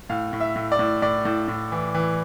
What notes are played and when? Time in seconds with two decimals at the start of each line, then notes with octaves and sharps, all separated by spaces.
0.09 A2 F5
0.33 A2
0.40 E5
0.56 A2
0.72 D5
0.79 A2
1.02 A2 D5
1.25 A2
1.48 A2
1.72 E3
1.94 E3